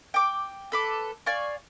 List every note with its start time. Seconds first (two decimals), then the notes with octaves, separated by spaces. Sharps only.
0.14 G5 D6
0.72 A4 B4 D6
1.26 D5 F5 G#5 C#6